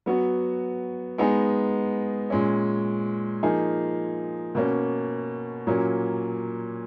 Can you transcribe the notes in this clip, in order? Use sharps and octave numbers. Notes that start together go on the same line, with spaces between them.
F#3 B3 F#4
G#3 B3 D#4 G#4
A#2 G#3 C#4
F3 A#3 D#4 G#4
B2 A#3 C#4
A#2 F#3 A#3 C#4